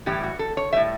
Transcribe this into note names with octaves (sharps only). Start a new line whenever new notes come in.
A2 E3 G3 G4
F#4
A4
C#5
A2 G3 E5